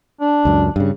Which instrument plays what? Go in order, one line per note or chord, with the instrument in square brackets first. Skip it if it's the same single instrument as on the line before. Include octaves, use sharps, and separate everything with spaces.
[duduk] D4
[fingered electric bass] C#2 F#2
G2 C#3